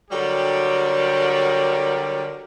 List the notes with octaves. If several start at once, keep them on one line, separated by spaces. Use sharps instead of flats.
D3 F#3 G3 G4 A#4